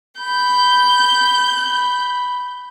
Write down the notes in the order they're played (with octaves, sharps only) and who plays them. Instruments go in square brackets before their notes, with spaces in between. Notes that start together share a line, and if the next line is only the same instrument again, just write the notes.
[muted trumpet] B5 [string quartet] G6